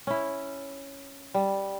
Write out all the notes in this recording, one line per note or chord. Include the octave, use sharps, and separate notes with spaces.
C#4 E4
G3